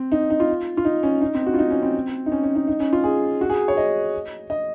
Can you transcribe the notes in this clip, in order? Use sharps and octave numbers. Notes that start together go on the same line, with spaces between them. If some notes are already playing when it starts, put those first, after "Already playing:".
Already playing: C4
D#4
D#4
F4
F4
D#4
C#4
D#4
C4
F#4
F4
D#4
C#4
C4
D#4
C#4
C#4
D#4
D#4
C#4
F4
G#4
F#4
G#4
C#5
D#5
D#5